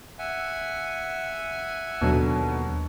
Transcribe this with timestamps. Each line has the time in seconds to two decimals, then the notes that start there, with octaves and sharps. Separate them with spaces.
0.19 E5 F#5 G#5
2.01 D#2 B2 D3 F#3